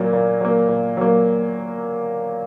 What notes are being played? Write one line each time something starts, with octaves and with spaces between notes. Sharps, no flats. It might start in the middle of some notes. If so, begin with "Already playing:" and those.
Already playing: A#2 F#3 A#3
A#2
F#3 A#3
A#2
F#3 A#3